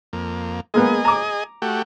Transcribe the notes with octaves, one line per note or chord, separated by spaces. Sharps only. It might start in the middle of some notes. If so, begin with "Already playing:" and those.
F2 A#3
G#3 A#3 B3 G#4 D#5
A#5 D6
A3 F#4 G4